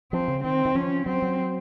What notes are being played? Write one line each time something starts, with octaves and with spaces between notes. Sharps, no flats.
F3 C4
C#3
D#3 C4
D#3
F3 C#4
F#3 C4
F#3